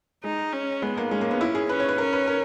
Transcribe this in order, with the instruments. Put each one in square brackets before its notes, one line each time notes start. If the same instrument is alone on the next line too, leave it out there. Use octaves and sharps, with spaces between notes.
[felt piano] G#3 [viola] D#4
[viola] C#4
[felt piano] G#3 [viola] B3
[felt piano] A#3
[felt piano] G#3 [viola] C#4
[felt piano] A#3
B3
E4
G#4
[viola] C#4 [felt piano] B4
[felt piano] C#5
B4
[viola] C#4 [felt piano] A#4
[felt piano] B4
A#4